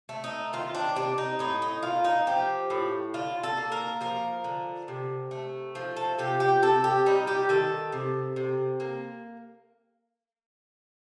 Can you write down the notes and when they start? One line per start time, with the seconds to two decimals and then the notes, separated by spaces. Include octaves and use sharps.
0.09 A3
0.24 D#4
0.53 D#3 F4
0.75 D4
0.96 C3 D4
1.18 D#4
1.39 A2 D#4
1.62 D#4
1.83 A#3 F4
2.04 D#4
2.27 F3 G4
2.70 A2
3.14 D3 F4
3.43 A4
3.57 A#3
3.72 A#4
4.01 F3 A#4
4.44 D3
4.88 C3
5.31 A3
5.75 F3
5.97 A4
6.18 C3 G4
6.40 G4
6.62 C3 A4
6.84 G4
7.06 G3 D#4
7.27 G4
7.49 D#3 A4
7.92 C3
8.36 C3
8.80 A#3